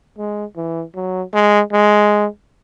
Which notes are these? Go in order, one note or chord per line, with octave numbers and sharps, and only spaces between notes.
G#3
E3
F#3
G#3
G#3